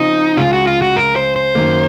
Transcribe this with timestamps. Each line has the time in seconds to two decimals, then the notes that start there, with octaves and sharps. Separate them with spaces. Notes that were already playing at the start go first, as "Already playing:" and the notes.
Already playing: C#3 F3 C4 D#4
0.37 C#2 C#3 G#3 F4
0.53 F#4
0.67 F4
0.82 F#4
0.96 A#4
1.16 C5
1.36 C5
1.55 F#2 D#3 A#3